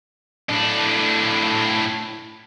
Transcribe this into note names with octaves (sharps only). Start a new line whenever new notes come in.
A2 D4